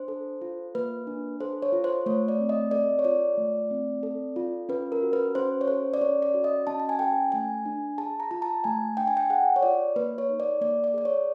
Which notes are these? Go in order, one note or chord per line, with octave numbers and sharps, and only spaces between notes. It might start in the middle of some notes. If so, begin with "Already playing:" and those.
Already playing: D4 C5
A4
F4
A#3 B4
D4
A4 C5
C#5
F4
C5
A3 C#5
D5
C4
D#5
A4 D5
C#5
F4 D5
A3
C4
A4
F4
C#4 B4
A#4
F#4
B4
C#4 C5
C#5
A4 C5
D5
C#4 C#5
D5
F#4
D#5
C#4 A5
A5
G#5
A4 G5
A3 G#5
D4
G#4 A5
A#5
F4 A#5
A5
A3 G#5
D4 G5
G#5
G5
G#4 F#5
C#5
F4 D5
A#3 B4
C#5
D#4
D5
A#3 D5
D5
G#4 D5
C#5